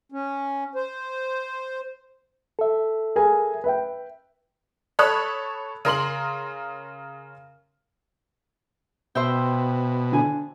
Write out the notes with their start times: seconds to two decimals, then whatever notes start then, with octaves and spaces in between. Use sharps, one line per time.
0.12 C#4
0.75 C5
2.59 A4 E5
3.16 G#4 A#4 G#5
3.64 B4 E5 G5
4.99 A4 C#5 B5 D#6 F#6
5.85 C#3 A#4 C6 F#7
9.15 B2 C5 E5 G5
10.12 D3 G#5